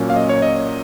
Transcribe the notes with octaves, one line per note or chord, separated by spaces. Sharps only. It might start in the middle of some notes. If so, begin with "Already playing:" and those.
Already playing: A#2 F#3 A#3 C#4
F5
D#5
C#5
D#5